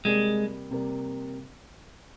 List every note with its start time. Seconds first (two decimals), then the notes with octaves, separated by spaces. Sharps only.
0.05 C3 G3 G#3 A#3
0.71 C3 G3 A#3